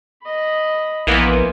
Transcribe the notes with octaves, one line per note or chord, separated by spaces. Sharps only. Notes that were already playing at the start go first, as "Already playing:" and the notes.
D#5 B5
A#1 E3 A#3 B3 C5 G#5